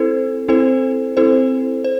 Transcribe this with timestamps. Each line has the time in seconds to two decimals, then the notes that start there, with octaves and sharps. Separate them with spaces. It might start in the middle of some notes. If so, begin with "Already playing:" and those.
Already playing: C4 E4 A4 C5
0.48 C4 E4 A4 C5
1.17 C4 E4 A4 C5
1.84 C5